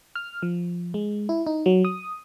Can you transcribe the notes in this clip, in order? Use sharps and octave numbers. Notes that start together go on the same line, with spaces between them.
F6
F3
G#3
E4
D#4
F#3
D#6